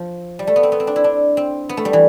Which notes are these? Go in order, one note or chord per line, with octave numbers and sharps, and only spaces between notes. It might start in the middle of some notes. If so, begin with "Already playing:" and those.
Already playing: F3
G3
A3
B3
C4
B3
C4
D4
E4
D4
C4
B3
A3
G3
E3